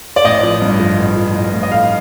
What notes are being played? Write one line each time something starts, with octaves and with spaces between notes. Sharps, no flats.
D5
A1 D#5
F3
G2
F3
A1
F3
A1
A1
D#5
A1 F5